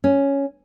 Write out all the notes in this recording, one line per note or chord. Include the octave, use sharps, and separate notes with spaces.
C#4